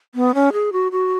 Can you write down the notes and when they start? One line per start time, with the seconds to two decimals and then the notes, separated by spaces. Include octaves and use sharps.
0.15 B3
0.35 C#4
0.53 G#4
0.72 F#4
0.92 F#4